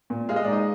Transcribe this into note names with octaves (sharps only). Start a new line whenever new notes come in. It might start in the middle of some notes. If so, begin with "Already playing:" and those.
A#2
G#3 F5
D#5
D5
D#4 D#5